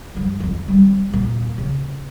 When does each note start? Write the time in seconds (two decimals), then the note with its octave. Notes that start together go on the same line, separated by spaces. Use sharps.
0.15 G2 F3
0.40 F2 D#3
0.68 G3 C4
1.09 E2 A#2
1.58 C#3